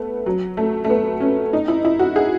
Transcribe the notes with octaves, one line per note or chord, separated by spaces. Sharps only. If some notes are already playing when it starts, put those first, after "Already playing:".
Already playing: A3 B3
F#3
A3
A3
B3
C#4
D#4
E4
E4
F#4
G#4